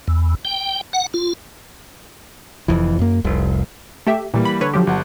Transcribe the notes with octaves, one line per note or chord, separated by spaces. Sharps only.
E2
G5
F#5
F4
F1 F2 E3
F#2 A#3
F1 C2
A3 G4 E5
A#2 E3 G3 A#3
B5
D3 B4 C#5
F3 F#3 G4
G1 F#5 A5